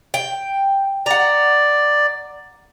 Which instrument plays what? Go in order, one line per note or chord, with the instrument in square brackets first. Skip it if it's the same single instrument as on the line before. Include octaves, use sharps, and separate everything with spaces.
[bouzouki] G5
[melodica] D5 [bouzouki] F#5 A#5